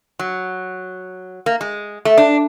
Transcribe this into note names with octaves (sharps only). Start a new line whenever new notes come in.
F#3
A#3
G#3
A3
D4